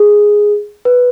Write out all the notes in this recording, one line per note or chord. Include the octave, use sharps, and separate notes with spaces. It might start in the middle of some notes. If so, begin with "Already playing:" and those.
Already playing: G#4
B4